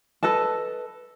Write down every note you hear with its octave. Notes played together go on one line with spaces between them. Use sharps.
A4 B4 D#5 A5